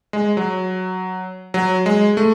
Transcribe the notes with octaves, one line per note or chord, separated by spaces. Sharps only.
G#3
F#3
F#3
G#3
A3